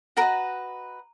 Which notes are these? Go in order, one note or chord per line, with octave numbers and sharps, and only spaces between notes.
F#4 A#4 B4 D#5 A#5